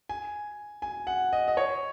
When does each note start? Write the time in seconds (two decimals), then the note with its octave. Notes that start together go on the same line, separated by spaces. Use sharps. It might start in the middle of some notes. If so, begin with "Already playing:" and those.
0.09 G#5
0.82 G#5
1.07 F#5
1.33 D#5
1.48 D#5
1.57 C#5